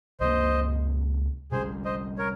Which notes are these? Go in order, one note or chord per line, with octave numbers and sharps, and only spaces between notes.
C#2 C3 F3 A#3 C5 D#5
C3 G3 C#4 G#4 C5
C5 D#5
A#4 C#5